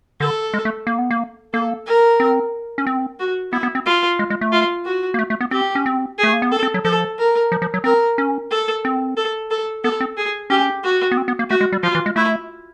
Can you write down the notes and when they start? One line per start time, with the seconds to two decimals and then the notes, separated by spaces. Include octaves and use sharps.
0.20 D3 A4
0.54 G#3
0.65 A3
0.87 A#3
0.98 B3
1.11 A#3
1.53 A#3 A4
1.86 A#4
2.20 C4
2.78 C#4
2.87 C4
3.20 F#4
3.52 B3 E4
3.63 B3
3.75 C4
3.86 F4
4.19 G#3
4.30 G#3
4.41 A3
4.52 F4
4.85 F#4
5.14 A#3
5.19 A3
5.30 A3
5.41 B3
5.51 C4 G4
5.75 C#4
5.86 C4
6.18 A3 G#4
6.33 A#3
6.42 B3
6.51 C4 A4
6.63 C4
6.74 F#3
6.85 F3 A4
7.18 A#4
7.52 F3
7.62 F3
7.74 F#3
7.84 C4 A#4
8.18 C#4
8.51 A4
8.85 C4
9.17 A4
9.51 A4
9.84 B3 A4
10.00 C4
10.17 G#4
10.50 C#4 G4
10.83 F#4
11.11 B3
11.17 C4
11.28 B3
11.39 A#3
11.50 A3 F#4
11.61 G#3
11.72 G3
11.83 F3 F4
11.95 E3
12.06 G#3
12.16 A3 E4